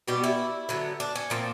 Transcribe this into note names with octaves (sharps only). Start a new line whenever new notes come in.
B2 G3 B3 G4
E4
D3 F#3 B3
D4
C#4
A#2 F3 A#3 C4